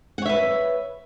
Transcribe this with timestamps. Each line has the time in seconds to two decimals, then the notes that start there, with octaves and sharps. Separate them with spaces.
0.18 F#5
0.22 C#5
0.26 E5
0.29 B4